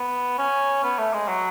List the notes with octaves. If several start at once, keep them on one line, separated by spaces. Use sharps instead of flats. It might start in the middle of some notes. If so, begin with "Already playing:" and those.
Already playing: B3
C#4
B3
A3
G#3
F#3